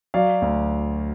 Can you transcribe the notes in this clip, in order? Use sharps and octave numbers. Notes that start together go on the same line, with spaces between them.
F#3 D5 F5
D2